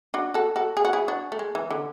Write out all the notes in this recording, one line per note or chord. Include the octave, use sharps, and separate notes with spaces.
D4 F#4
F#4 A4
F#4 A4
G#4
F#4
E4 G#4
D4 F#4
A3
G#3
E3
D3